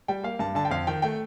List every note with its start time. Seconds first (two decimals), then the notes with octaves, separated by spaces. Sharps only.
0.08 G3 G5
0.23 A#3 F5
0.39 G2 A5
0.55 D3 A5
0.65 G5
0.71 F2 F5
0.87 D#3 G5
1.02 A3 G5